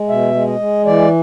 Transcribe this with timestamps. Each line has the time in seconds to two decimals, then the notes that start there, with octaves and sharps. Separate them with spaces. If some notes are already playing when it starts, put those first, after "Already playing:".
Already playing: G#3
0.09 B2 E5
0.35 G#3
0.47 D#5
0.59 G#3
0.85 E3 D5